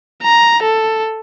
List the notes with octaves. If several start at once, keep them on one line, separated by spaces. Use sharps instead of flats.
A#5
A4